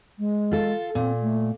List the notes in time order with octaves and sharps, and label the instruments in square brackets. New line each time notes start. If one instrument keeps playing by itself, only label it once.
[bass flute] G#3
[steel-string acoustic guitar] F4 A4
[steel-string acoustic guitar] A#2 [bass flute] C4
[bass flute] A3